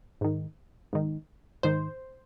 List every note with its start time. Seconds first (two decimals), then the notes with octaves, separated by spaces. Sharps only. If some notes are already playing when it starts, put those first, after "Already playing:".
0.21 G#2 D#3
0.93 G#2 D#3
1.63 G#2 D#3 C5